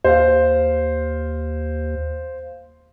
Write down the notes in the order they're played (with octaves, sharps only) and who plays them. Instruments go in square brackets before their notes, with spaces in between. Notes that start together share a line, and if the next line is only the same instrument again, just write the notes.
[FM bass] D#2 [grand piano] C5 F5